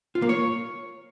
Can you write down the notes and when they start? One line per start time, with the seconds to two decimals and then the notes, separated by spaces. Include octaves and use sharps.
0.15 F4
0.22 A#3
0.29 C#5